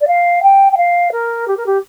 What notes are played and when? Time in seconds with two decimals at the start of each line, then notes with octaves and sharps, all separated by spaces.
0.01 D5
0.07 F5
0.42 G5
0.72 G5
0.77 F5
1.12 A#4
1.47 G4
1.57 A#4
1.66 G4